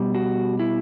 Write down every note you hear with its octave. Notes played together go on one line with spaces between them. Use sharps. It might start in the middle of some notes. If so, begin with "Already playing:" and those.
Already playing: B2 G3
F#4
E4